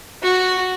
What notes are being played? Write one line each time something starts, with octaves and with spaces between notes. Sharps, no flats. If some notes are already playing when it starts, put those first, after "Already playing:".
F#4